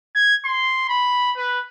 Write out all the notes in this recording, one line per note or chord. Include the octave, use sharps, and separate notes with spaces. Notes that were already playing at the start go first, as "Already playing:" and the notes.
G#6
C6
B5
B4